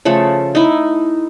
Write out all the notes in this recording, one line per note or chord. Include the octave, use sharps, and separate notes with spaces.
C#3 F3 A3
D#4 E4